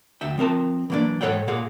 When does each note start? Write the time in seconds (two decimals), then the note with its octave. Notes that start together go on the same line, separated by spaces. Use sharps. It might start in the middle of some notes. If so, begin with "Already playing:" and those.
0.21 D2 E5 G5
0.38 F3 C4 A#4 A5
0.90 E3 F#3 A#3 C#4 D4
1.21 G#2 A4 C#5 F#5 G5
1.47 A#2 A#3 G#4 F5 F#5